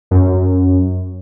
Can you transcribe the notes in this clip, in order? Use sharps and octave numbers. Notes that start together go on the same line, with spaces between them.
F#2